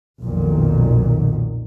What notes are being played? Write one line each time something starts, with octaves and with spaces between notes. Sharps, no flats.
B1 F2 A#2 D#3